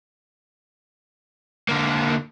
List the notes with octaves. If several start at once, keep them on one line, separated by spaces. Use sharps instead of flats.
D3 A#3